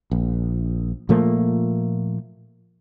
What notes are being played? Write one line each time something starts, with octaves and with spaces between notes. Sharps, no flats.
A#1
A#2 F3 A3 A#3